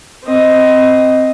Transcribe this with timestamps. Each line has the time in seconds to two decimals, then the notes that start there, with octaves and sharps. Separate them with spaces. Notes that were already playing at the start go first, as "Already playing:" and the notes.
0.25 C4 D#5